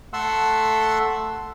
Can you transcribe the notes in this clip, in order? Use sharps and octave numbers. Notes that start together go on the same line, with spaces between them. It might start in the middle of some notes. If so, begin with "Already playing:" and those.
A3 A4 E5 F#5 C6 E6